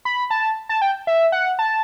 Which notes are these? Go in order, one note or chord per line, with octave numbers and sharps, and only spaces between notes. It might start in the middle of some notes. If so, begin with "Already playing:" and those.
B5
A5
A5
G5
E5
F#5
A5